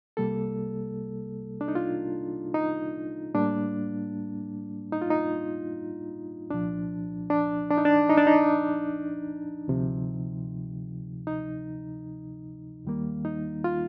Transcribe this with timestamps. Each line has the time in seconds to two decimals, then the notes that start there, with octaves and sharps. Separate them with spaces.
0.17 C2 C3 G3 A#3 A4
1.61 D4
1.68 D#4
1.75 F4
2.54 D#4
3.34 A2 G3 A#3 D4
4.92 D#4
5.02 F4
5.11 D#4
6.50 C2 A#2 F3 D4
7.30 D4
7.70 D4
7.78 D#4
7.85 D4
8.09 D#4
8.18 D4
8.27 D#4
9.68 D2 C3 F3
11.27 D#4
12.85 D#2 D#3 G3 A#3
13.25 D#4
13.64 F4